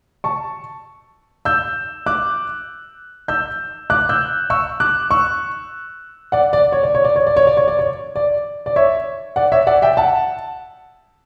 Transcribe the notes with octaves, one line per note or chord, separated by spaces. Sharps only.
A5 C#6
E6 G6
D6 F#6
E6 G6
D6 F#6
E6 G6
C#6 E6
D6 F#6
C#6 E6
D5 F#5
D5
C#5
D5
C#5
D5
C#5
D5
C#5
D5
C#5
D5
C#5
D5
D5
C#5 E5
D5 F#5
C#5 E5
D5 F#5
E5 G5
F#5 A5